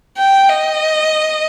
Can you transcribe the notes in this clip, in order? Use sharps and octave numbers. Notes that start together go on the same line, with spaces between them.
G5
D#5